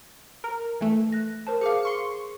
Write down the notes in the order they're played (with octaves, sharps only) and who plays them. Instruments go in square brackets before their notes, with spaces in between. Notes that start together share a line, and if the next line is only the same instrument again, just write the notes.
[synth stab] A#4
E3 A3
[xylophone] F#6 A#6
A#4 C5 A5
[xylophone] G#4 D6 [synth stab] F5 C#7
[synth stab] C6 C#6 C#7